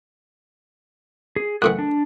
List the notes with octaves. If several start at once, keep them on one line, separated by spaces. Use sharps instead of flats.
G#4
F#2 A2 E3 F#5 F#6
D4